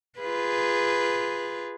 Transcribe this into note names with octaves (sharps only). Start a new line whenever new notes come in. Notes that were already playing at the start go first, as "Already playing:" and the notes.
F4 G#4 B4